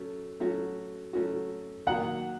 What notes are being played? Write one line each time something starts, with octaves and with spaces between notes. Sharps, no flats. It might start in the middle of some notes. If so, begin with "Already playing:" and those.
Already playing: F#3 A3 C#4
F#3 A3 C#4 F#4
F#3 A3 C#4 F#4
D#3 F#3 A#3 F#5